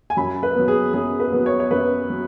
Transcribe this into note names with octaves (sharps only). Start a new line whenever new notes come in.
G#5
F#2 B5
B4
F#3 B3
G#4
F#2 G#4
B4
F#3 B3
C#5
C#5
F#2 B4
F#3